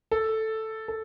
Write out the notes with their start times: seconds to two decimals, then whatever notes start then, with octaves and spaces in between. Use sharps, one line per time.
0.11 A4
0.88 A4